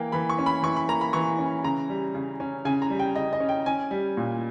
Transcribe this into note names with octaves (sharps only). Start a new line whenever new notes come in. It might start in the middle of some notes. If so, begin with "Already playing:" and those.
Already playing: E3 A#3 G5
E3 B5
C#6
C#4
B5
E3 C#6
B5
A#3 A#5
B5
E3 C#6
C#4
C#3 A#5
G3
C#3
C#4
C#3 G#5
A#5
G3
G5
C#3 D#5
D#5
C#4
G5
C#4 G#5
G3
A#2